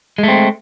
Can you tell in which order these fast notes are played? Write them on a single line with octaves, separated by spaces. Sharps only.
G#3 A3 C4